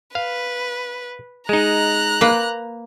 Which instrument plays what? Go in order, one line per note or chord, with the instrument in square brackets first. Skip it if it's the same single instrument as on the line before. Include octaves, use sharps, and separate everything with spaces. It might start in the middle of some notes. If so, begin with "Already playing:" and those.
[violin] B4 [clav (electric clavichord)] F5
[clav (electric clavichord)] G#3 D#4 [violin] A#5 F#6
[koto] A#3 B4